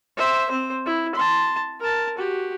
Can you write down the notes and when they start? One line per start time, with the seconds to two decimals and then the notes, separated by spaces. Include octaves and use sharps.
0.17 C5 E5
0.49 C4 C5
0.86 E4
1.15 A5 C6
1.80 A#4 A5
2.17 F#4 G4